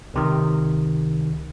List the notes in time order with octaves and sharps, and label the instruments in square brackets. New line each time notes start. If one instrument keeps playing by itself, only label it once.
[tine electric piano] C#2 C3 D#3